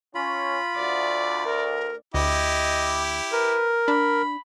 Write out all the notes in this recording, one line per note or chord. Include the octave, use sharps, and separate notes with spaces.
C#4 F4 B5
D2 D5
A#4
D2 E4 G4 D#5
A#4 B4
D4 B5